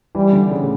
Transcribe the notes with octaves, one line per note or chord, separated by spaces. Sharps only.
E3 G3
D3
C#3
A2